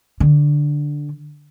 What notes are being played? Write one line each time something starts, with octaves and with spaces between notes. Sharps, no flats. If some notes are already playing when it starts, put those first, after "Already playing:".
D3